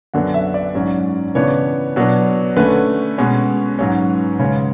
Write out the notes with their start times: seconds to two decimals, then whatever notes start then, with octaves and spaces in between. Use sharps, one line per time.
0.14 F#2 D3 F#3 B3 F#5
0.34 E5
0.54 D5
0.75 G#2 F#3 C#4
1.35 C#3 E3 B3 D4 C#5
1.96 B2 F#3 B3 D4
2.57 D3 A3 C#4 B4
3.18 B2 G#3 C#4
3.79 G#2 F#3 C#4
4.39 C#3 G#3 C#4 C#5